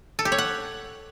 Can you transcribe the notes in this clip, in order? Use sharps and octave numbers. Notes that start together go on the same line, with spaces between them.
A4
G4
C#5
F#5